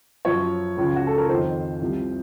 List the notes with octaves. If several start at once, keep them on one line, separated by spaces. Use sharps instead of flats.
F#2 F3 C#5
C#2 C#3 F3
F#4
A4
A#4
F2 D#3 C5
C2 C3 F3